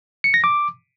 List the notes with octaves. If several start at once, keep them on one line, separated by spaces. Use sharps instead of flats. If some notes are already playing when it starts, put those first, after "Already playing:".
C#7
A#6
D6